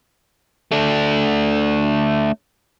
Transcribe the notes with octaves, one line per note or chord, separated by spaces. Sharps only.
A3 D4